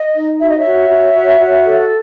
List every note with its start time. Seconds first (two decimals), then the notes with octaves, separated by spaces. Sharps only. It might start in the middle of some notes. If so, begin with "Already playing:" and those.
Already playing: D#5
0.15 D#4
0.40 F#4 E5
0.48 D#5
0.57 C#5 E5
0.65 F#4
0.89 F#4
1.15 F#4
1.39 F#4
1.64 A4